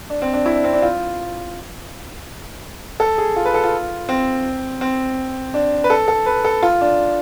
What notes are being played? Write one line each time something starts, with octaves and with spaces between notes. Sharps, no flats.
D4
C4
D4
E4
D4
C4
D4
F4
A4
G#4
F4
B4
A4
F4
C4
C4
D4
B4
A4
A4
B4
A4
F4
D4